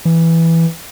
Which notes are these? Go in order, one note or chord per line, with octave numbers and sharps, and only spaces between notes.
E3